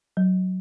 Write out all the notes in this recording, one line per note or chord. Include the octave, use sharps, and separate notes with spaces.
F#3